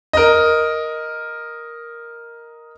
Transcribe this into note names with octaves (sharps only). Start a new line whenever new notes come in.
A#4 D#5